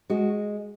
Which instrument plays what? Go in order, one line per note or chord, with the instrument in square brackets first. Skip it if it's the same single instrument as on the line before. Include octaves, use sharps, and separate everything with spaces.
[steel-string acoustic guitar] G#3 F#4